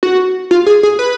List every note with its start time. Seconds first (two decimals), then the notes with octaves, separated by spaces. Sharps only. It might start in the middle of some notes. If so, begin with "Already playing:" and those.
0.03 F#4
0.51 F4
0.66 G#4
0.83 G#4
0.99 B4